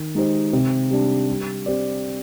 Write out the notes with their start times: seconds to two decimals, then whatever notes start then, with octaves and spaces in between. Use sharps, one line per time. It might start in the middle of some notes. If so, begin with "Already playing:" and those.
Already playing: D#3
0.15 G#3 D#4 G4 C5
0.53 C3
0.91 G3 D4
1.28 G3
1.66 C4 G4 D5